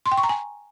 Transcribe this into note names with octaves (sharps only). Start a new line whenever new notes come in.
C6
G5
C#6
A#5
G#5